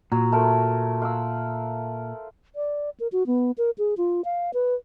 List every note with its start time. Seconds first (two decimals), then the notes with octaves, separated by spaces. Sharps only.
0.12 A#2 F#3
0.32 A3 A#4 C5
1.02 F5 F#5 E6
2.56 D5
3.00 A#4
3.12 F#4
3.27 B3
3.58 A#4
3.78 G#4
3.97 F4
4.25 F5
4.54 B4